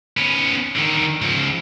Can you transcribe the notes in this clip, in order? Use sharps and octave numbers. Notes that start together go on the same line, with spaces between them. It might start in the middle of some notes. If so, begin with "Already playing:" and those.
B3 C#4
D3 D#3
C#2 F3